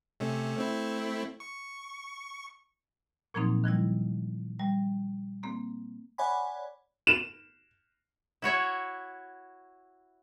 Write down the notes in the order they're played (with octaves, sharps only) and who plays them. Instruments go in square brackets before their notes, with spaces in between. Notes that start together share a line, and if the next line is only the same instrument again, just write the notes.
[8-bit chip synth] C3 A3 C#4
A3 C4 E4
C#6
[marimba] A#2 F3 F#3 A#3 C4 D#4
D#3 F3 G3 E4
G3
A#3 C4
[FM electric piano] C#5 D5 F#5 G#5 B5
[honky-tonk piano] E7
[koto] E4 F#4 C#5 E5